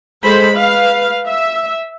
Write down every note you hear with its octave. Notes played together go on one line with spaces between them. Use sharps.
G#3 A4 C5 B5
B4 F5
E5